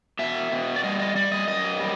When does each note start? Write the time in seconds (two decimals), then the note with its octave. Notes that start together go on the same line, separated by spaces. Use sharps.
0.19 B2 E5
0.52 B2
0.76 D5
0.83 G3 D#5
1.00 D#5
1.15 G3 D5
1.32 D#5
1.48 F#2 D#5
1.80 G3